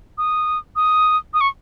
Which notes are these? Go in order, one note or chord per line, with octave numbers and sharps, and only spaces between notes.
D#6
D#6
D#6
C#6